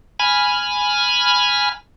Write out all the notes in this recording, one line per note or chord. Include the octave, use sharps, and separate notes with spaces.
G#5 B5 F6